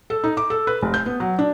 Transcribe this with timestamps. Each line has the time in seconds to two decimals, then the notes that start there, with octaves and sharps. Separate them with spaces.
0.10 A4
0.24 D#4
0.37 D6
0.50 A4
0.67 B4
0.82 F1
0.94 G6
1.06 B3
1.20 F#3
1.39 D4